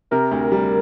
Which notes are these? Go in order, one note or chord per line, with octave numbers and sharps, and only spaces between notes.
C3 A#4
D2
G3